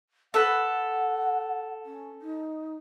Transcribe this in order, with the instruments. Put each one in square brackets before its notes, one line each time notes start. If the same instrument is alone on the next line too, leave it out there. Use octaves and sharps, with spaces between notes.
[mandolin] A4 B4 [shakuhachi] F#5
[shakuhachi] C#4
D#4